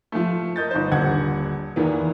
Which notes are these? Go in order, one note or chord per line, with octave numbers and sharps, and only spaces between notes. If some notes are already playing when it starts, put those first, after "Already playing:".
F3 A3
A#4 D#5 G6 A6
G1 D#4 C5
D#1 D3 F#5 G#6
E2 D#3 E3 A#3 B3